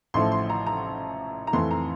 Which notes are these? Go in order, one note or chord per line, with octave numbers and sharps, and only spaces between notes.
A1 A2 F3 A3 C6
C6
A#5
A#5
A#5
F2 E3 A3 C6
A#5